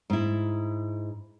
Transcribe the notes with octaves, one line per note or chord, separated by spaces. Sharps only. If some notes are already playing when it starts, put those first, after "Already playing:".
G#2 E4